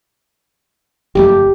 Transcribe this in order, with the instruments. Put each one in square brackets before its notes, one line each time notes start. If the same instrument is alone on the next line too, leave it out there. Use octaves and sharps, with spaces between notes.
[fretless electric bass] F#1 F2 A3 [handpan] G4